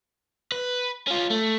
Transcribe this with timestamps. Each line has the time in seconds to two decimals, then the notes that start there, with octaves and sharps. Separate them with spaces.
0.52 B4
1.08 C#4 F4
1.31 A3